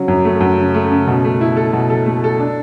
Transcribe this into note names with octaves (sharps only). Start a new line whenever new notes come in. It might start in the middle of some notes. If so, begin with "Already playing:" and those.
Already playing: C#3 F#3
F#2
A3
F#2
C#3
A3
C#3
B2
A3
E4
A4
B2
A4
A3
A4
D4